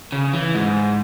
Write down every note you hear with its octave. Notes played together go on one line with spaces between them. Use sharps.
C#3
E3
G#2